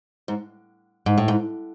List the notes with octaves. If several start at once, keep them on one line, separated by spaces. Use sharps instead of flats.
G#2
G#2
A2
G#2